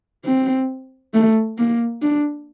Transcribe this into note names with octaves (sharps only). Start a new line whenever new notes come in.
C4
A3
A#3
D4